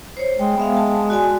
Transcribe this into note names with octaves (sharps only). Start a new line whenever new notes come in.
C5 C#5
G#3 G5
G#3 B3 E5 F5
A5
F#4 D5 G#5